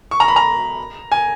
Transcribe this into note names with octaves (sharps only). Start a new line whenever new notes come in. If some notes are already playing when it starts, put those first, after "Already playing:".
C#6
A#5
B5
A#5
G#5